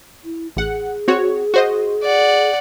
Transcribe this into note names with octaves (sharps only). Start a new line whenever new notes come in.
E4
A1 G#4 F#5
C4 F#4 C#5
F#4 C5 D#5
D5 F#5